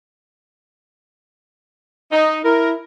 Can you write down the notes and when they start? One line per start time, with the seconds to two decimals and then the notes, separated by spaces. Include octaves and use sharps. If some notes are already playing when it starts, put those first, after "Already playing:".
2.11 D#4
2.44 E4 A#4